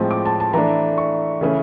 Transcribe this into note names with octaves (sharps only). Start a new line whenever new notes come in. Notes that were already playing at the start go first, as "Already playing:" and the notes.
Already playing: A2 F3 G#3 C4
D6
A5
A5
E3 A3 D4 A#5
C#6
C#3 E3 A3 C#4